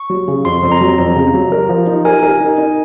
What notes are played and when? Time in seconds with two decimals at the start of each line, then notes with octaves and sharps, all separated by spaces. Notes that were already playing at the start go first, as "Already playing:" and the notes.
Already playing: C#6
0.10 F#3
0.28 C#3
0.45 F2 C6
0.63 F2
0.72 A#5
0.81 F#3
0.98 F2 A#5
1.16 C#3
1.34 F#3
1.52 A#4
1.69 F3
1.87 D#4
2.05 A#4 G#5
2.23 A#4
2.41 D#4
2.58 D#4